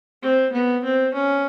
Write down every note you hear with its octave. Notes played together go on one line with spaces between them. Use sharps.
C4
B3
C4
C#4